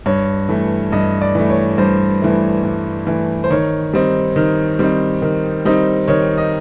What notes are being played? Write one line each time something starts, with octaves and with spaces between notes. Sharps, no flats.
G2 C#5
E3 A3
G2 D#5
D5
E3 A3
C#5
G2 C5
E3 A3
G2
E3 A3
C5
D#3 C#5
G3 C4 D#4
D#3
G3 C4 D#4
D#3
G3 C4 D#4
D#3 C#5
D#5